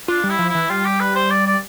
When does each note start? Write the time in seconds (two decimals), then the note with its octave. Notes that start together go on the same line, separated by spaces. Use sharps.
0.08 D4 F4
0.24 G3
0.29 E4
0.38 F3
0.49 E4
0.55 E3
0.69 G3 F4
0.85 G4
1.00 B4
1.15 C5
1.30 D5
1.47 D5